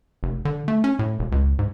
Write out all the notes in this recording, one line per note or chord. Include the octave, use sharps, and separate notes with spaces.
F1
D3
A3
C#4
A2
E1
C#2
G#2